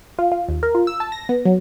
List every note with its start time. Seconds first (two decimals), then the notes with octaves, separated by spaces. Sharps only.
0.19 F4
0.32 F4
0.48 D#2
0.63 A#4
0.75 F4
0.87 E6
1.00 A5
1.12 A#6
1.29 B3
1.45 F#3